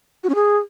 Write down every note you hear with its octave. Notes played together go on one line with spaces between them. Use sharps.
F#4
C#4
G#4